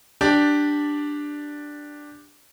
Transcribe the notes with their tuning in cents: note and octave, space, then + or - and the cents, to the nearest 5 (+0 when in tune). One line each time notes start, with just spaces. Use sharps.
D4 +0 G4 +0 D5 +0